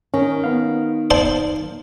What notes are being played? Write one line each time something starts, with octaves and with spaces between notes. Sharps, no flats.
D#3 C#4
B3 F5
C5 D5 A5